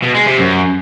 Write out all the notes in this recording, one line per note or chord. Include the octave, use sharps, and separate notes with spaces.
B2
G#3
C3
F#2